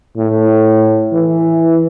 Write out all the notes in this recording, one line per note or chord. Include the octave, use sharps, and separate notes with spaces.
A2
E3